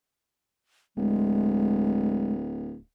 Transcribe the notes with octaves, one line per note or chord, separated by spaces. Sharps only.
D1 G#3